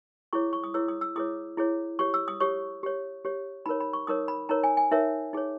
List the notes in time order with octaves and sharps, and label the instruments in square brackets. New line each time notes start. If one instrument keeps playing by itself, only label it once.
[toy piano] E4 G#4 C#5 C#6
C#6
D#6
E4 G#4 C#5 E6
D#6
E6
E4 G#4 C#5 D#6
E4 G#4 C#5
G4 C#5 C#6
E6
D#6
G4 C#5 C#6
G4 C#5
G4 C#5
D#4 A#4 C#5 B5
B5
C#6
D#4 A#4 C#5 D#6
B5
D#4 A#4 C#5 A#5
G#5
G#5
D#4 A#4 C#5 E5
D#4 G#4 C#5